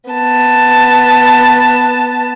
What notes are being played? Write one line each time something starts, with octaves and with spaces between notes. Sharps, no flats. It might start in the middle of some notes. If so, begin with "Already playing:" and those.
B3 A5